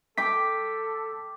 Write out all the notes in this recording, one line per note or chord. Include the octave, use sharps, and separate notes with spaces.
A4 G5 D6 B6